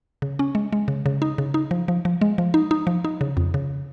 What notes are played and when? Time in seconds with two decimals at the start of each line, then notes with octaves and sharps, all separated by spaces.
0.22 C#3
0.39 C#4
0.55 G#3
0.73 G#3
0.88 C#3
1.06 C#3
1.22 D#4
1.38 C#3
1.54 D#4
1.71 F3
1.88 F3
2.05 F3
2.21 G#3
2.38 F3
2.54 D#4
2.71 D#4
2.87 F3
3.05 D#4
3.21 C#3
3.37 F2
3.54 C#3